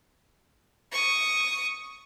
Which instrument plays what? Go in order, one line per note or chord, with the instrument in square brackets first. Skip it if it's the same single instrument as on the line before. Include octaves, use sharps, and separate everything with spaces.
[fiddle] C#6 D#6